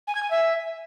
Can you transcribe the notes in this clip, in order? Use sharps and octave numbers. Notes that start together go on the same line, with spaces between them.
G#5
G#6
G#5
E5